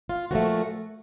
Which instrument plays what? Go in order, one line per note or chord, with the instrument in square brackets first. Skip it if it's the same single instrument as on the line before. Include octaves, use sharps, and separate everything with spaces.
[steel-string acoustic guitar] F4
A#2 F3 A3 F#4